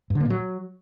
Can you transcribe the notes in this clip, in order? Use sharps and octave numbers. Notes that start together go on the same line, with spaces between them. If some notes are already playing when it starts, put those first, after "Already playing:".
G2
D3
A#3
A#2
F#3